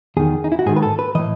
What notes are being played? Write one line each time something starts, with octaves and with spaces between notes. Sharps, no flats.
E2 D#3 G#4
D#4
E4
F#4
G#2 D#3 G#4
B4
A4
B4
A2 E3 D#5